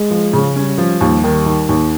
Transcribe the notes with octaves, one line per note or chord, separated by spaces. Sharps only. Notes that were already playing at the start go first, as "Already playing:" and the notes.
Already playing: G#3
F3
C#3
G3 C#4
F3
D#2 G3
D#3
D#3
D#2